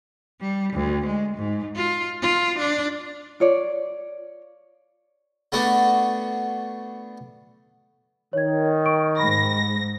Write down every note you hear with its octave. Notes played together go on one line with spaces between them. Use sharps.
G3
D2
G#3
G#2
F4
F4
D4
F4 C#5 D5
A3 B3 D4 F#4
D#3 C#5 G#6
C#6 D7
G#2 B5 A#6